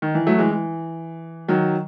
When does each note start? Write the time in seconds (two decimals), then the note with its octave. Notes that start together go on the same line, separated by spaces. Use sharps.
0.02 D#3
0.15 E3
0.27 F#3 A3
0.38 E3 G#3
0.51 E3
1.48 D#3 F#3